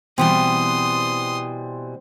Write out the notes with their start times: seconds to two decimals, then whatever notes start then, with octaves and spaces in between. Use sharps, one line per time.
0.18 B2 E3 G3 C4 C5 C6 D#6